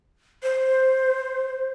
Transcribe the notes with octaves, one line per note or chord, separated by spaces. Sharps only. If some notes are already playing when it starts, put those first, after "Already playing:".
C5